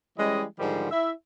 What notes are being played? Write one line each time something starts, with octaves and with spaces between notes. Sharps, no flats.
E3 G3 G#3 C#4 D#5
G#2 D3 D#3 F3 G3
E4 E5